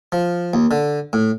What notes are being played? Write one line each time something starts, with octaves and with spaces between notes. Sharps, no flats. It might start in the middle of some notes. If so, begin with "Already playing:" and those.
F3
D#2
D3
A2